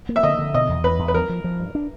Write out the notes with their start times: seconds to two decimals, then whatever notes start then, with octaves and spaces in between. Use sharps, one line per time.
0.09 A#3
0.16 E5
0.23 D3 D#5
0.39 D3
0.54 B2 D#5
0.69 E2
0.84 E2 B4
0.99 E2
1.08 B4
1.14 F3 A#4
1.29 F3
1.44 F3
1.60 G2
1.75 D4